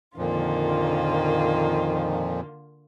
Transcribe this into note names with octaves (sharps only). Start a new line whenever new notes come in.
F2 A#2 D3 D#3 F3 A#3 F4